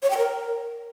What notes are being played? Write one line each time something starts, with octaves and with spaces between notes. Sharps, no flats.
C#5
G5
A#4